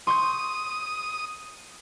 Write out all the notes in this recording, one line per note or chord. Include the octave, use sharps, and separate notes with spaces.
C6 C#6 D#6 G6